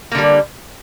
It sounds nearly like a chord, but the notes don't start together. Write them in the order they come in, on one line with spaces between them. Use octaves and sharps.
A#3 D3 G3